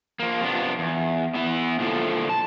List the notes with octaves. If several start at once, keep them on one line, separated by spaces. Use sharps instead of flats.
F3 A#3
C3 F3 B3 D4
E2
B3 E4 E5
A#2 D3 F3 E4 A4
A5